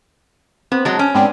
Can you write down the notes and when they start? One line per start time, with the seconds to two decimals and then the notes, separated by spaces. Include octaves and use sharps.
0.72 B3 C4
0.85 F#3 G#3 A5 A6
0.99 C#4 G6 D7
1.15 G#2 B3 C4 D4